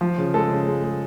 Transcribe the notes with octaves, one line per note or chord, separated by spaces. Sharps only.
F3
C#3
G#3 A4
C#3
G#3
G#3